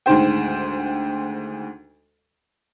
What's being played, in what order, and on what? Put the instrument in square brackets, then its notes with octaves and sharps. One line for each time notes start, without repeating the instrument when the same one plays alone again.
[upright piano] D2 G#2 D#3 C5 G5